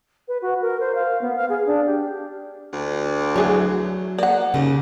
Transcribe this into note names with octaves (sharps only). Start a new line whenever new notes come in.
B4
F#4
A#4
C5
F5
B3
F5
G#4
D4
G4
D2
E3 F#3 G#4 C#5
A#3 D5 F#5
D#2 C#3